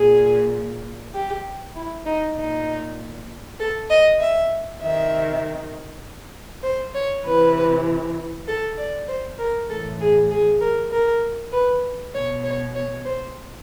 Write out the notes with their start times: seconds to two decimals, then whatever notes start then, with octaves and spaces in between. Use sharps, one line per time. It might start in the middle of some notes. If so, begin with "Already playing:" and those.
Already playing: A#2 G#4
1.14 G4
1.75 E4
2.06 D#4
2.36 A#2 D#4
3.59 A4
3.90 D#5
4.20 E5
4.80 C3 D#3 E5
6.64 C5
6.95 C#5
7.25 C3 E3 B4
8.48 A4
8.78 D5
9.08 C5
9.39 A#4
9.69 A2 E3 A4
10.00 G#4
10.31 G#4
10.61 A#4
10.92 A#4
11.52 B4
12.14 B2 C#5
12.44 C#5
12.75 C#5
13.05 C5